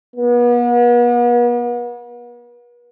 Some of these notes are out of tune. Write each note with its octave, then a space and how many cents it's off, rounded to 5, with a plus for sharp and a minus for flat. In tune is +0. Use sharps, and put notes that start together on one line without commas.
B3 -40